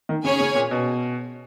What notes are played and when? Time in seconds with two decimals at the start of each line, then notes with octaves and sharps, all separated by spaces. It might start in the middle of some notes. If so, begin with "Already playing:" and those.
0.09 D#3
0.24 C#3 C#4 G#4 C#5 G#5
0.40 C#3
0.55 A#2
0.71 B2